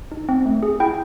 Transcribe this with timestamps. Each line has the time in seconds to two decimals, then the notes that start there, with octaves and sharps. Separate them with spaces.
0.12 D#4
0.29 C4
0.46 A3
0.63 G#4
0.80 E4 G5